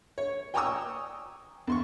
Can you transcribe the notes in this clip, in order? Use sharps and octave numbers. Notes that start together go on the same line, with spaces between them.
C#5
G5 G#5 A#5 C#6 D#6 E6
E2 C6 C#6